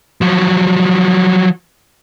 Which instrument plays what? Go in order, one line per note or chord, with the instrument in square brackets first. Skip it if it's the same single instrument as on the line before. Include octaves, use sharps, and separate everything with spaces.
[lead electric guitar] F3 F#3